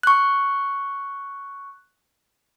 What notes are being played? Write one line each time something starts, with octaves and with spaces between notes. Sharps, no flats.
C#6 F#6